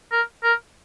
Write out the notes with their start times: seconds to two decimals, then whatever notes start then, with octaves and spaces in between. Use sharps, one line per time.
0.12 A#4
0.43 A#4